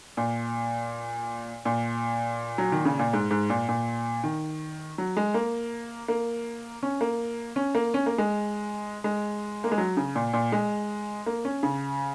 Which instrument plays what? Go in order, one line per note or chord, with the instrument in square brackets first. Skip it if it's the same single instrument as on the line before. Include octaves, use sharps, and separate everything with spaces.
[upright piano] A#2
A#2
F#3
D#3
C#3
A#2
G#2
G#2
A#2
A#2
D#3
F#3
G#3
A#3
A#3
C#4
A#3
C#4
A#3
C#4
A#3
G#3
G#3
A#3
G#3
F#3
C#3
A#2
A#2
G#3
A#3
C#4
C#3